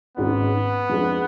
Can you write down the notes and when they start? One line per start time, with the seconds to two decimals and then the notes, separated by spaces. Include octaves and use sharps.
0.17 G#1 G#2 G#3 B3 C#4
0.89 F2 F3 G#3 D4 G#4